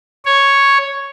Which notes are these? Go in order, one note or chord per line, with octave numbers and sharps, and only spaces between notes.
C#5